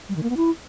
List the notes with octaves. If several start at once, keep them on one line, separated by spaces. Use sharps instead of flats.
G3
D#3
A#3
B3
E4